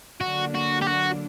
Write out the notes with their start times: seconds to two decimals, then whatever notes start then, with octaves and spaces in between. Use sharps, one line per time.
0.21 D3 F#3 A#3 D4 F#4
0.55 F#4
0.82 G4
0.87 F#4